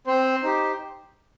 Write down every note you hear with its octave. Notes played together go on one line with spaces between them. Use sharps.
C4 C5
D#4 G4